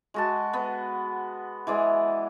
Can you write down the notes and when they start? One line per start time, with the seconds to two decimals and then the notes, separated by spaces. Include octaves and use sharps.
0.14 G#3 F#4 A5
0.53 B3
1.67 E3 G#3 D5